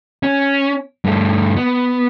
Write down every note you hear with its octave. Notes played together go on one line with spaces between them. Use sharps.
C#4
G2 A3
B3